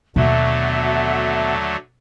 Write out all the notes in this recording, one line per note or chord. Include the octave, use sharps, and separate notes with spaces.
D#2 B2 D3 F#3 A3 F#4 E5